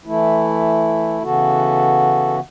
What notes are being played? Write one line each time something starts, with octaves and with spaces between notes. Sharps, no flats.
E3 A3 E4
C#3 E3 B3 F#4 A4